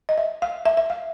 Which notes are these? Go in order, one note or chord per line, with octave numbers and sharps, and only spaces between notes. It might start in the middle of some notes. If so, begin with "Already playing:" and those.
D#5
E5
F5
E5
E5
F5